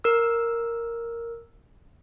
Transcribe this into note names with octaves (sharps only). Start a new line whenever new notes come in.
A#4 E6